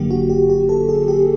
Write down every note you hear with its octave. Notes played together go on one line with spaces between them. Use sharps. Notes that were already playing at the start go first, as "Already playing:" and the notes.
Already playing: G1 F#2 D3 F#3 A#3 G4
F#4
G4
G4
A4
G#4
G4